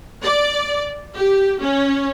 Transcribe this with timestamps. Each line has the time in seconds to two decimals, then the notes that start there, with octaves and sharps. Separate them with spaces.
0.24 D5
1.16 G4
1.61 C#4